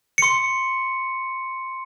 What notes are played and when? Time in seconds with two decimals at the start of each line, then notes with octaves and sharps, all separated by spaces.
0.18 C6 C#7